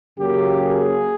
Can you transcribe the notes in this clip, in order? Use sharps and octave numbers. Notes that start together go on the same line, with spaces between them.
F#2 C#3 F#3 A#3 G4
G#4